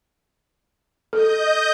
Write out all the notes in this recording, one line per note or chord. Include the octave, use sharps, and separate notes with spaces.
A4 D#5 G6